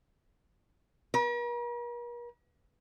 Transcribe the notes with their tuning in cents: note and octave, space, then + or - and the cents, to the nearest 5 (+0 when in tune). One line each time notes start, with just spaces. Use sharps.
A#4 +45